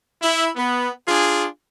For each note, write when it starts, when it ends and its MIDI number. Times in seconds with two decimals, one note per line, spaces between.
0.21 0.48 64
0.56 0.88 59
1.07 1.45 62
1.07 1.45 65
1.07 1.45 68